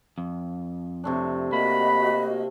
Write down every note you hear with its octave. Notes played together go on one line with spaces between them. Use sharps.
F2
C3 A3 D4
A#3 F#4 D#5 B5